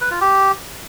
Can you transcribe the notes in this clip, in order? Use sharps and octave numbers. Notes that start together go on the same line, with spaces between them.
B4
F4
G4